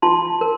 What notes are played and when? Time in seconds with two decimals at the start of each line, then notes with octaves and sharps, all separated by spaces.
0.02 F4 A5 C6
0.41 A#4